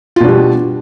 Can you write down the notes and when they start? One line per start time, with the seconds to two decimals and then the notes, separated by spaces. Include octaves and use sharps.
0.16 F4
0.20 B2
0.24 D4
0.28 G3